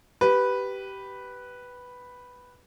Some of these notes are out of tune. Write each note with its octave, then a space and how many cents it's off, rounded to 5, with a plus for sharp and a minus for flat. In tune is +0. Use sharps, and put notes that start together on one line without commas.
G4 -15 B4 +0